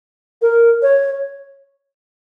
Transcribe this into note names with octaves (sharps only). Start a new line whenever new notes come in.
A#4
C#5